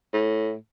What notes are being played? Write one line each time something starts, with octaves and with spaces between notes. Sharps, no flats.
A2